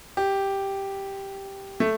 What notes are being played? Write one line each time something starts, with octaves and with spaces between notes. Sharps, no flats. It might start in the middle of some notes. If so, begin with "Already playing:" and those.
G4
A3